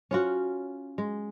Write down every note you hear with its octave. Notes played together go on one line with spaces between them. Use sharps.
C#4 F4 F#4
G#3